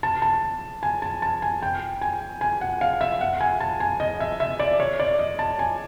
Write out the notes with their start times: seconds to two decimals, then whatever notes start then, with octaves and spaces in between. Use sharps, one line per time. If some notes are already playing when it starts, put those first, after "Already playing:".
0.03 A5
0.22 A5
0.83 G#5
1.02 A5
1.22 A5
1.42 G#5
1.62 G5
2.01 G#5
2.41 G#5
2.61 F#5
2.81 F5
3.01 E5
3.21 F#5
3.41 G#5
3.60 A5
3.80 G#5
4.00 D#5
4.20 E5
4.40 E5
4.60 D5
4.80 C#5
5.00 D5
5.19 D#5
5.39 A5
5.59 G#5